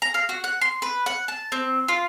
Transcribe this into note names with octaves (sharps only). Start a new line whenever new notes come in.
A#5
F5
F#4
F#5
C6
B4
F#5
A5
C4
F4